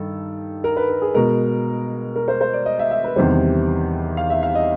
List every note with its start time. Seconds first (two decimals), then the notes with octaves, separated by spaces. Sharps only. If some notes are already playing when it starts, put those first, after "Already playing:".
Already playing: G2 D#3 A4
0.64 A#4
0.77 B4
0.89 A#4
1.02 G#4
1.14 B2 G#3 A#4
2.16 A#4
2.28 C5
2.41 C5
2.53 D5
2.66 D#5
2.79 E5
2.91 E5
3.04 B4
3.16 E2 C3 D#3 G3 C5
4.17 F5
4.30 E5
4.43 F5
4.55 D#5